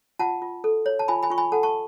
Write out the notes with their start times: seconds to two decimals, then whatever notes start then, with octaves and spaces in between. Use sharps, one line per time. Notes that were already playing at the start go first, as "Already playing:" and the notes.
0.19 F4 F#5 A5
0.42 F4
0.64 A4
0.86 C#5
0.99 A5
1.08 F4 G#5 B5
1.23 G#5 B5
1.30 F4 C#6
1.38 G#5 B5
1.52 A4 F#5 A5
1.63 A5 C#6